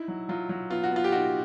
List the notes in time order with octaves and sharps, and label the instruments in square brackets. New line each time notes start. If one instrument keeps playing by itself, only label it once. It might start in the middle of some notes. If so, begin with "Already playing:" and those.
Already playing: [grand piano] D#4 E4
F#3
F#3 F4
F#3
B3 F4
F#4
B3 F4
G4
D#4 F#4